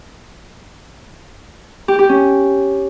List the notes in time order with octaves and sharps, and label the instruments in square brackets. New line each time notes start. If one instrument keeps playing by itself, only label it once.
[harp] G4
G4
C#4